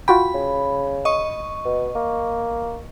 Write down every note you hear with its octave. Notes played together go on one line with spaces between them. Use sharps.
F4 F#4 G5 B5
C#3
D#5 C#6
B2
A#3